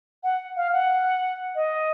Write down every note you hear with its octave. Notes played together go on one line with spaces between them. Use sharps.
F#5
F5
F#5
D#5